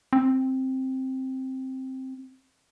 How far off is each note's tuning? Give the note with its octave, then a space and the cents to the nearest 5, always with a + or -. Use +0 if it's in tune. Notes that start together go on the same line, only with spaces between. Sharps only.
C4 +5